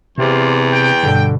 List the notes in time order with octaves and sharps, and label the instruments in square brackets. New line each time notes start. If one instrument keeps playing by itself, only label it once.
[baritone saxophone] E2 [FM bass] C3 [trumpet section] F4 C5 D5
[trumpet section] G5
[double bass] G2 B2 [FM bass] D3